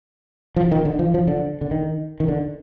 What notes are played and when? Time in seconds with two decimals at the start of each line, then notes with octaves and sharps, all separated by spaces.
0.56 F3
0.71 D#3
0.85 D3
0.99 F3
1.14 F3
1.28 D3
1.61 D3
1.71 D#3
2.20 D#3
2.28 D3